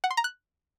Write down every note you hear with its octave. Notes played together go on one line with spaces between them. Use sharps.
F#5
C6
A#5
F#6